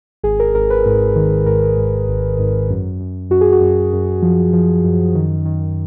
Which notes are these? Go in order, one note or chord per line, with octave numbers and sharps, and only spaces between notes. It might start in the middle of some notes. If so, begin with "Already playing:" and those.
G#1 G#4
A#4
G#1 A#4
B4
G#2
D#3
G#2 A#4
G#2
G#1
G#2
F#2
F#2
F#2 F#4
G#4
F#4
F#2
F#2
F3
F3
F#2
D#3
D#3